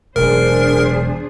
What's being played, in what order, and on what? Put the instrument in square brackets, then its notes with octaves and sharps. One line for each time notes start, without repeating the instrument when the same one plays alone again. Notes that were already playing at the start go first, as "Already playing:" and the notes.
[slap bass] E1 F#2 [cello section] D4 G#4 C5 [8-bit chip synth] A#4